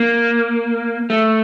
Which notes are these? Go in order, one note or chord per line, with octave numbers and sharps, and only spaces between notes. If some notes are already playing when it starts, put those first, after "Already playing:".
Already playing: A#3
A3